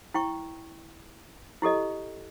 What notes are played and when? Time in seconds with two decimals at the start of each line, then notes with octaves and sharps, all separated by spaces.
0.14 E4 G5 C#6
1.62 E4 G4 A4 D#5